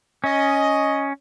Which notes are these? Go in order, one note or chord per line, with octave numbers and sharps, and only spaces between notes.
C#4 D#5